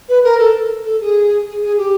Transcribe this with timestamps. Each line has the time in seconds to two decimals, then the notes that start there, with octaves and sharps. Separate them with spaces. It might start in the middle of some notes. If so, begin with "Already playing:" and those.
0.09 B4
0.24 A#4
0.39 A4
0.85 A4
1.01 G#4
1.46 G#4
1.62 G#4
1.78 G4